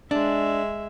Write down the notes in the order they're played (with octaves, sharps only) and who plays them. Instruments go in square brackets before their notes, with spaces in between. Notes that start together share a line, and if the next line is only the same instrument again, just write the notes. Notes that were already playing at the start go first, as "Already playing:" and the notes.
[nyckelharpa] G#3 E5 [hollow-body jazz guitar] D4